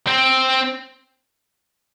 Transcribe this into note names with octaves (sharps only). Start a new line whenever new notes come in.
C4